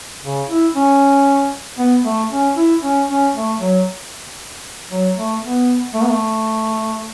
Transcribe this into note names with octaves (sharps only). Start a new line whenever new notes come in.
C#3
E4
C#4
B3
A3
C#4
E4
C#4
C#4
A3
F#3
F#3
A3
B3
A3
B3
A3